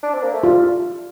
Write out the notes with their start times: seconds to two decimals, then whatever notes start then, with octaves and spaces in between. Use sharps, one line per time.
0.03 D4
0.13 C4
0.23 A#3
0.33 A3
0.43 G3 F4